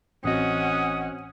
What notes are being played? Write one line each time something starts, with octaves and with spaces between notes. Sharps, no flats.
A1 C4 C#4 F#4 D#5 F#5 D#6